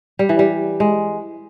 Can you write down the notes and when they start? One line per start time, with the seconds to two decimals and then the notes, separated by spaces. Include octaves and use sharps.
0.19 G3
0.29 E3
0.39 G3
0.80 G#3